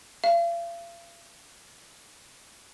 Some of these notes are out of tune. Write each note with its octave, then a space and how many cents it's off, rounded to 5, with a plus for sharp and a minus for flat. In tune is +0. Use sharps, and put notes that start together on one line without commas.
F5 -40